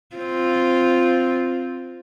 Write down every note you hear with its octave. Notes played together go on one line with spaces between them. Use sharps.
C4 F4